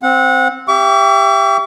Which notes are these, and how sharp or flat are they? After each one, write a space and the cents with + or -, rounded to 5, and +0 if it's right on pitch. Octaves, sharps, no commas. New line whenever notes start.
C4 +0 F#5 -25
G4 +10 E5 +30 C#6 +45